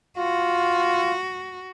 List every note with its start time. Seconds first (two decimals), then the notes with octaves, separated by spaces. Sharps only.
0.18 F4 F#4